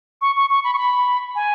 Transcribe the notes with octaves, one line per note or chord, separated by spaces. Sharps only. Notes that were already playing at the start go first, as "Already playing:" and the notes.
C#6
C#6
C#6
B5
C#6
B5
G#5